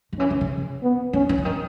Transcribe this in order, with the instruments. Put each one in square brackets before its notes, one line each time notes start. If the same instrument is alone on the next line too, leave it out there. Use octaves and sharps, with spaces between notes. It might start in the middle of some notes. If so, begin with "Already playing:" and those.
[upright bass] D#3
[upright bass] E3 [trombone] C#4
[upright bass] D3
C#3
[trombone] B3
[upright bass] D#3 [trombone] C#4
[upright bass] E3
D3
D#3